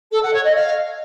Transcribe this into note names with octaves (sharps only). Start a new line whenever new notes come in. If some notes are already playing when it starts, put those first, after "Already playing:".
A4
F#5
C#5
D#5
F5